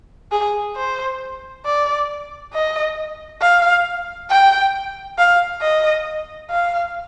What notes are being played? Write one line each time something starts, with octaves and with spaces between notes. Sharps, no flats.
G#4
C5
D5
D#5
F5
G5
F5
D#5
F5